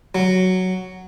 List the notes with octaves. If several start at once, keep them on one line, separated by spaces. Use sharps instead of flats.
F#3